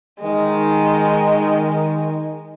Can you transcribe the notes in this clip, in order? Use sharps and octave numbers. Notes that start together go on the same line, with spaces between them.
D#3 G#3